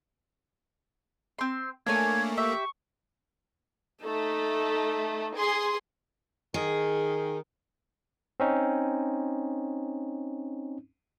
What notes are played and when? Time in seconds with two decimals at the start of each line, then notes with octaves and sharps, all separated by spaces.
1.39 C4 C6
1.86 A3 A#3 D4 C#5 G#5 G#6
2.37 G4 E5 C#6
4.03 A3 D#4 A4
5.37 G#4 C6
6.54 D#3 G#4
8.40 C4 C#4 D#4